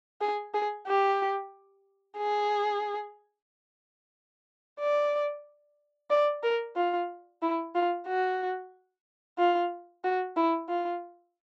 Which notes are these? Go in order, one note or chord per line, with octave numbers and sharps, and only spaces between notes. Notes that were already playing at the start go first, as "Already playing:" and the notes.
G#4
G#4
G4
G#4
D5
D5
A#4
F4
E4
F4
F#4
F4
F#4
E4
F4